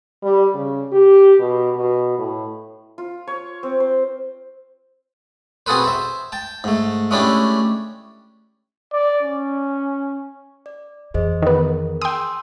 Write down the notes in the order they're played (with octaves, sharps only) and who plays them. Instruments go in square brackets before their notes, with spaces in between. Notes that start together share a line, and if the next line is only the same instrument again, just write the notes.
[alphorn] G3
C#3
G4
B2
B2
A2
[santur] F4
C#5
C4
C5
[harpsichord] C4 F#4 G#4 A4 B4 C5
C5 E5
G5 A5
G#2 A3
G#3 A3 C#4 D4 E4 G4
[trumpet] D5
C#4
[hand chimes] D5
[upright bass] F2 E3 [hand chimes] G#4 C5 D#5
[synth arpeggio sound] D#3 B3 [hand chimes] G#4 A#4
[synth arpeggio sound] G5 D#6 [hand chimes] G#5 C6 E6